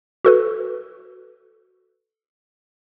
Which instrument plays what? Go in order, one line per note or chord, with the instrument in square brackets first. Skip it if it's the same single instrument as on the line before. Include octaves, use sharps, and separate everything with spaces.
[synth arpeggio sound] F#4 A4 B4